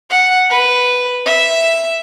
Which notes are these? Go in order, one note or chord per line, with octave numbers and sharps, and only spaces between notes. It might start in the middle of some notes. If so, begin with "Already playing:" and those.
F#5
B4
E5